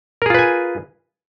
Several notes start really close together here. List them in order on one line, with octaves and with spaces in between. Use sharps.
A#4 G#4 F4 B4 G#5